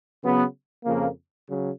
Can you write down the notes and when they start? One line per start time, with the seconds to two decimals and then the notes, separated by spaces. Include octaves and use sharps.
0.21 C#3 F#3 B3
0.84 F2 C#3 F3 A#3
1.47 C#3 F#3